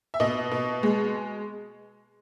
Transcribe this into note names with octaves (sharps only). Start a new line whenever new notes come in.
E5
B2 D#5
B2
G#3